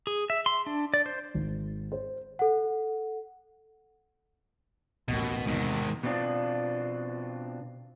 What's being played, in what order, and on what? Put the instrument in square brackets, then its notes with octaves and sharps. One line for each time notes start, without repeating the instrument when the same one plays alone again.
[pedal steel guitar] G#4
E5
C6
D4
D5
C5
[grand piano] G#1
C5
[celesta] A4 F#5
[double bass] A1 D#2 [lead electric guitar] B2
[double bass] E2 C3 [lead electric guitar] G#2 D#3
[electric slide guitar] B2 B3 C4 D4 F4